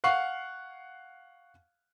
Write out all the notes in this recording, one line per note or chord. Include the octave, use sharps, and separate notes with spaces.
F5 F#5 C#6 C7